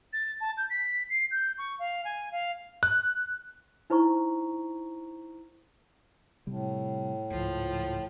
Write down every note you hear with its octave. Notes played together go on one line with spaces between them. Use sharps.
A6
A5
G6
B6
C7
G6
C#6
F5
G#5
F5
F#6
D#4 E4 C5 A#5 C#6
A2 C3 G3
C#2 G#2 F3